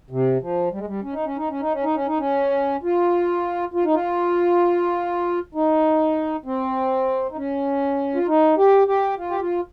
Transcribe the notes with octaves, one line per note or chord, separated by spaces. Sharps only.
C3
F3
G3
G#3
G3
C#4
D#4
C#4
D#4
C#4
D#4
C#4
D#4
C#4
D#4
C#4
F4
F4
D#4
F4
D#4
C4
D#4
C#4
F4
D#4
G4
G4
F4
G4
F4